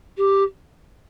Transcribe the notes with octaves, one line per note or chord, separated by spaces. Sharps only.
G4